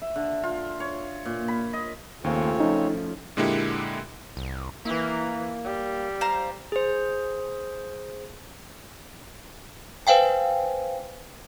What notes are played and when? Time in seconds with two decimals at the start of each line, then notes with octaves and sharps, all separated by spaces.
0.02 E5
0.16 D3
0.43 F4
0.80 C#5
1.25 A#2
1.48 B5
1.73 D#5
2.24 D#2 C#3 A3 C4 F4 C#5
2.60 F3 C#4 D#4
3.37 A#2 D3 G#3 A#3 E4 G4
4.37 C2
4.85 E3 A#3
5.65 G3
6.21 C5 F5 A#5
6.72 G#4 C5
10.07 B4 C5 F5 G5 G#5